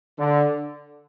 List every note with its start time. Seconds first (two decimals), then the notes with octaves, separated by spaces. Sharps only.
0.18 D3